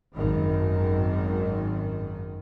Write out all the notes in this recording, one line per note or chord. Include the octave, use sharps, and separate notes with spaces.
G#1 F#2 D#3